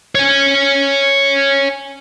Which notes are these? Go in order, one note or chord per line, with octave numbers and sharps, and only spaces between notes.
C#5 G#5